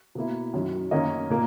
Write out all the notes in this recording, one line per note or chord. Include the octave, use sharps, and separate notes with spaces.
B2 A#3 E4
F#2 D#3 F#3
F#2 D#3 A#3 C#4 D#5
A#2 A#3